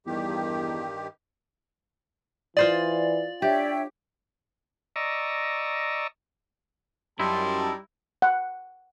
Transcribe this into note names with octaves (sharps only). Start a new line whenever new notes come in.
E2 G2 D#3 G4
E3 F4 C5 D5 D#5
D4 G4 C#5 E5 G5
D5 D#5 A#5 C#6 E6
F#2 G3 D#4 E4 A5 C6
F#5